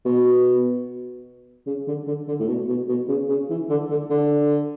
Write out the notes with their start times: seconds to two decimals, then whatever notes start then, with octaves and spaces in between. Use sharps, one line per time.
0.05 B2
1.66 C#3
1.87 D3
2.07 D3
2.28 D3
2.39 A2
2.48 B2
2.68 B2
2.88 B2
3.08 C#3
3.29 C#3
3.50 E3
3.69 D3
3.90 D3
4.10 D3